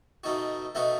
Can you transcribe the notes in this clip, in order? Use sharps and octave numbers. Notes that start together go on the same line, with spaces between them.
B2 A3 D#4 F#4
B2 A3 D#4 F#4